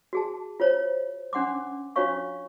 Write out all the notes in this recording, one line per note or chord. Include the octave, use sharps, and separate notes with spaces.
F#4 G#4 A5
F4 C5 C#5
C#4 D4 F#5 C6 D6
D4 F4 F#4 C#5 F5 C#6